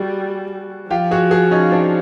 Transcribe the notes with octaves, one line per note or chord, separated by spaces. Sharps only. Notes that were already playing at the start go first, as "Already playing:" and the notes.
Already playing: G3 F#4 G#4
F3 F4 G4
F#4 G#4
F#4 G#4
C#4 D#4
C4 D4